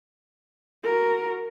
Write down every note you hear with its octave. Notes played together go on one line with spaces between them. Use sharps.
F#4 A#4